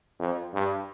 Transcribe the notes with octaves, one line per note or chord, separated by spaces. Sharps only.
F2
G2